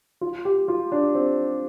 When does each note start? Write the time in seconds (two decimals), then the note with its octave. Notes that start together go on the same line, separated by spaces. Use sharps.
0.21 F4
0.45 G4
0.68 F4
0.92 D4
1.15 C4